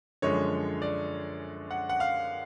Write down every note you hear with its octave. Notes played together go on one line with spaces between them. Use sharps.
F#2 D3 F3 G#3 C#5
D5
F#5
F#5
F5